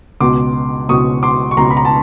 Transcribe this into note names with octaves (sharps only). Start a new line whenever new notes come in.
C#2 B2 C6 D6
C#2 B2 C#6 D#6
C6 D6
C#6
C#2 B2 A#5 C6
B5
A#5
A5